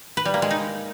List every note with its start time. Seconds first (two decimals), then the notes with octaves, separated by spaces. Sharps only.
0.17 B4
0.25 G3
0.34 A#3
0.42 G#3
0.51 D#4